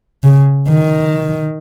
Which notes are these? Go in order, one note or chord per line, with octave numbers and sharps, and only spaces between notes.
C#3
D#3